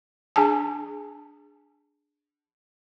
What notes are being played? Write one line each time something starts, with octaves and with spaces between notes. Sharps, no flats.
D4 G#4 G#5 A5